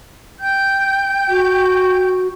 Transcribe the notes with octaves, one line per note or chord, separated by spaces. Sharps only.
G5 G6
F#4